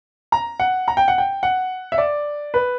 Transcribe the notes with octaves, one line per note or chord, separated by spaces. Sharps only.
A#5
F#5
A#5
G5
F#5
G5
F#5
E5
D5
B4